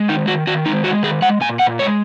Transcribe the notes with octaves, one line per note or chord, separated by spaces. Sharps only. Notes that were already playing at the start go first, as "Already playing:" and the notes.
Already playing: G#3
D#3 D#4
D#3 F#4
D#3 F#4
G#3 D#4
G#3 F#4
D#3 G#4
G#3 F#5
A#2 G#5
A#2 F#5
G#3 C#5